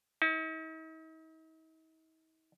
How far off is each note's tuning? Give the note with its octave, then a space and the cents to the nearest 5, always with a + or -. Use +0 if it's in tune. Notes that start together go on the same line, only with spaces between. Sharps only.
D#4 +45